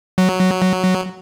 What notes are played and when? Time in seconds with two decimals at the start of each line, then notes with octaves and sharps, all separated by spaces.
0.18 F#3